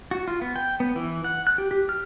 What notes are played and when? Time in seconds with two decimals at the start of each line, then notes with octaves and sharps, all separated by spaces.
0.11 F#4
0.28 F4
0.42 B3
0.56 G5
0.80 B3
0.96 E3
1.24 F#5
1.47 F#6
1.58 G4
1.71 G4
1.89 F6